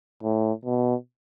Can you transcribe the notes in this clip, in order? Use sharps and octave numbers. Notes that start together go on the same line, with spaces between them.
A2
B2